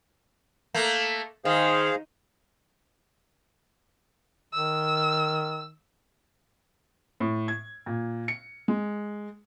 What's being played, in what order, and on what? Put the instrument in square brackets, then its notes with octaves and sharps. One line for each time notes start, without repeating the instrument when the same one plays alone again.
[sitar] A3 A#3
[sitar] D#3 [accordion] G#4 C5 F5
[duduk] D#3 [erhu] E6
[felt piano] A2
G#6
A#2
C#7
G#3